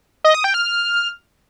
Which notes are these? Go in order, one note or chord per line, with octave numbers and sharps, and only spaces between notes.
D#5
D#6
G5
F6